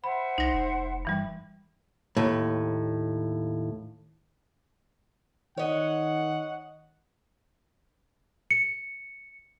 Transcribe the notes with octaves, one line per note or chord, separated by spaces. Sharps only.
C5 E5 F#5 B5
C2 D#4 A#6
F1
G2 E3 G3
D#2 A2
D#3 C#5 D#5 F#5
C#7